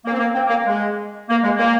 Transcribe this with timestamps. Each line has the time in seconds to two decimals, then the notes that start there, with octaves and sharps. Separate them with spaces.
0.05 A#3
0.12 C4
0.18 A#3
0.33 C4
0.47 A#3
0.66 G#3
1.29 A#3
1.43 G#3
1.57 A#3